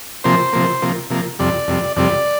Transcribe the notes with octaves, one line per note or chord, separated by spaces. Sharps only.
C3 F3 A#3 C5
C3 F3 A#3
C3 F3 A#3
C3 F3 A#3
F2 C3 G3 D5
F2 C3 G3
F2 C3 G3 D5